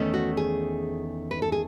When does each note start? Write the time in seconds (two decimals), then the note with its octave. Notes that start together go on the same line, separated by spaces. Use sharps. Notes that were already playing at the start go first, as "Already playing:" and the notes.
Already playing: E2 D#3 A3 C#4
0.14 F#4
0.37 G#4
1.31 B4
1.42 A4
1.52 G#4